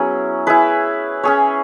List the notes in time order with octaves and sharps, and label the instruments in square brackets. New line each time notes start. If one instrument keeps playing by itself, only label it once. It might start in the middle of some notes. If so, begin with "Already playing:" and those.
Already playing: [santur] F#3 B3 C#4 E4 G#4
E4 G#4 B4
C#4 G#4 C#5